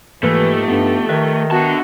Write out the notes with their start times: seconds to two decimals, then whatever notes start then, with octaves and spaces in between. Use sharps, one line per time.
0.23 G#2 E3 F3 A3 A#3 D#4 G4 B4
0.68 G2 B3
1.09 D#3 B4 D#5 E5
1.51 D3 B3 F#4 A5